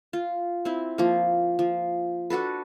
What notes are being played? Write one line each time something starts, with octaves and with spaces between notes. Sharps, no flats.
F4
C4 E4
F3 A#3
F3
D4 F#4 A4 B4